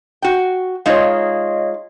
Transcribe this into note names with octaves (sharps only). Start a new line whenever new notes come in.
F#4 G5
G#3 D#4 F4 C#5 D#5 F5